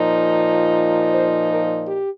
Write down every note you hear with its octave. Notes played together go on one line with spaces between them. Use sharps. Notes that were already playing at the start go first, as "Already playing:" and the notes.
Already playing: A#2 F3 D#4
C5
A#4
G4